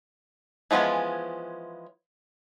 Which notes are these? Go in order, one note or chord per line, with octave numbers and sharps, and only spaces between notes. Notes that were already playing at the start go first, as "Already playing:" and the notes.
E3 F3 G#3 B3 C#4